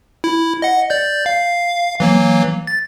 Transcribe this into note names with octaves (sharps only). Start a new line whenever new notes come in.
E4
D#5 F#5
D5 G6
F5
E3 F#3 A#3
A6